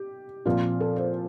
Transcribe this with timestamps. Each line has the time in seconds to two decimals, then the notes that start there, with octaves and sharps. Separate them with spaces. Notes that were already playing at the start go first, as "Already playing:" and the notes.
Already playing: G4
0.46 A#2 F3 C4 F4
0.80 A4
0.96 C5